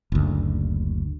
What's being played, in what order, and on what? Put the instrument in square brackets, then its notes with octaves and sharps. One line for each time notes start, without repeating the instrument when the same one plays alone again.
[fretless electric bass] F#1 D2